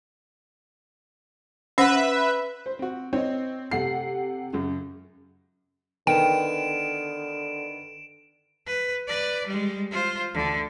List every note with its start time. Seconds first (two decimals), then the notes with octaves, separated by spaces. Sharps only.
1.78 C#4 B4 C5 E5 F#5
2.66 C5
2.79 C4 F#4
3.13 C4 C#5 D#5
3.71 C3 A3 F#5 C7
4.53 F#2 C#3
6.07 D3 D#3 B3 G5 D7 E7
8.67 B4
9.07 B4 D5
9.48 G3 G#3
9.91 F4 C5
10.34 D2 D3